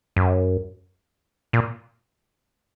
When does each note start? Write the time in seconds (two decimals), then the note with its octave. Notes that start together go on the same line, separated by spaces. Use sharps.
0.16 F#2
1.53 A#2